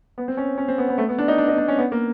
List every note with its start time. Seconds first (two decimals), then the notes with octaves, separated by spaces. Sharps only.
0.18 B3
0.28 C4
0.37 C#4
0.58 C#4
0.68 C4
0.78 B3
0.89 B3
0.98 A3
1.08 B3
1.18 D4
1.28 D#4
1.38 D4
1.48 D#4
1.58 D4
1.68 C#4
1.78 B3
1.92 A#3